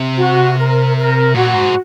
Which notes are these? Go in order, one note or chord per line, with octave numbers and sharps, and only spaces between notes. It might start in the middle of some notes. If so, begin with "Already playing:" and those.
Already playing: C3
F#4
A#4
A#4
A#2 F#4
G#2